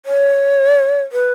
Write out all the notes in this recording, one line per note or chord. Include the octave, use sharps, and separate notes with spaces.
C#5
B4